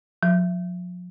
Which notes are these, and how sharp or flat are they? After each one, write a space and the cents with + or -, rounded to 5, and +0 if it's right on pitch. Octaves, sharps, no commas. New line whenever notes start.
F3 +45